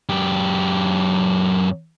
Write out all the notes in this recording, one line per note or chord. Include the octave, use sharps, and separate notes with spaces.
F#2 G4